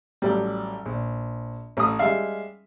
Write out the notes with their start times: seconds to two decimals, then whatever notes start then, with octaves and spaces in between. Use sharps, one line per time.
0.22 A1 F#3 G3
0.86 A#1
1.77 A1 D#6
1.99 G3 G#3 E5 F5